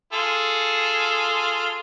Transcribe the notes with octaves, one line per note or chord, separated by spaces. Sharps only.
F4 G#4 A4